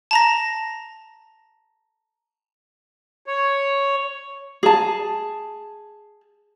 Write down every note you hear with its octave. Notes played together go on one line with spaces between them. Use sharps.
A5 A#5 A#6
C#5
G#4 A5